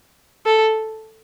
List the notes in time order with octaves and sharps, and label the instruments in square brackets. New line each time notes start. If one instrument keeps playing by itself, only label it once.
[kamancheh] A4